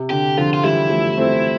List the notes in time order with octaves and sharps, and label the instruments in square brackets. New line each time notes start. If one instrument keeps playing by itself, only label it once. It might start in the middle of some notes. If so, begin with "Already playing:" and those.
Already playing: [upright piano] C3
[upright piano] D3 [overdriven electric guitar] G4
[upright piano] D3 F3 [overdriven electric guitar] F4
[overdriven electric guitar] F4
[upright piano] E3 G3 [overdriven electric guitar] E4
[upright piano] F3 A3
A3 C4